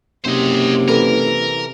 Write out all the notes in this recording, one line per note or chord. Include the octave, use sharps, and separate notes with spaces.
F#1 C3 C5 D#5
E3 A4 A#4